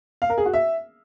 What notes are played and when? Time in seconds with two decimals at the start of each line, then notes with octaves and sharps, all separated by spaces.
0.22 F5
0.30 A#4
0.38 G#4
0.46 F#4
0.54 E5